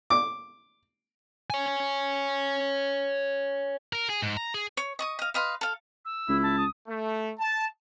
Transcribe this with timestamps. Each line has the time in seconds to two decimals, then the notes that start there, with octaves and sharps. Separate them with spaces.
0.10 D6
1.50 C#5 G#5
3.93 A#4
4.09 G#4
4.22 G#2
4.37 A#5
4.54 G#4
4.77 C#5
4.99 D#5 C#6 D#6
5.19 D#5 F5
5.34 B4 D#5 F5 C6
5.61 A4 F5
6.05 E6
6.29 C#2 E4
6.43 A5
6.58 D#6
6.88 A3
7.39 A5